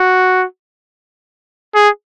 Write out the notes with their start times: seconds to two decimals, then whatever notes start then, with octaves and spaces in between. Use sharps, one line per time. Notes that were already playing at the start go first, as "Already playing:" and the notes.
Already playing: F#4
1.75 G#4